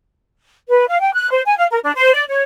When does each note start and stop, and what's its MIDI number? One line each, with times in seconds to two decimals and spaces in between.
0.69 0.87 71
0.88 0.99 77
1.00 1.12 79
1.13 1.28 90
1.30 1.41 72
1.45 1.57 80
1.58 1.66 77
1.71 1.79 70
1.83 1.92 62
1.95 2.12 72
2.13 2.23 74
2.28 2.42 73